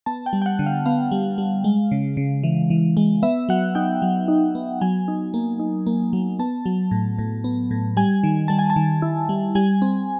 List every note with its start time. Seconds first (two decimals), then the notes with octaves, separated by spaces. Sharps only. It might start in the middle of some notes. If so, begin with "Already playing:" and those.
0.06 B3 A5
0.26 G5
0.33 G3
0.42 G5
0.46 F#5
0.59 D3
0.66 F5
0.86 B3 F5
1.11 G3
1.38 G3
1.64 G#3
1.91 C#3
2.17 C#3
2.43 E3
2.70 E3
2.97 G#3
3.23 B3 E5
3.49 F#3 F#5
3.75 D#4 G5
4.02 F#3
4.28 D#4
4.55 B3
4.81 F#3 G#5
5.08 D#4
5.34 A#3
5.59 D#4
5.87 A#3
6.13 F#3
6.39 B3 A5
6.66 F#3
6.91 A2
7.19 A2
7.44 B3
7.71 A2
7.97 G3 G#5
8.23 D#3
8.48 G3 A5
8.59 G#5
8.70 A5
8.76 D#3
9.02 E4
9.29 G3
9.55 G3 G#5
9.82 C4